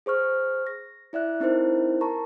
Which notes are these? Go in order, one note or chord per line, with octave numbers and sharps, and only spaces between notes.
G#4 C5 C#6 F6
A#6
E4 D5 E5 F#6
C4 D#4 E4 A#4 C5
A#4 A5 A#5 C#6